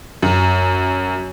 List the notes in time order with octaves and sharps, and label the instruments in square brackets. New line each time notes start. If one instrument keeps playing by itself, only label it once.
[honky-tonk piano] F#2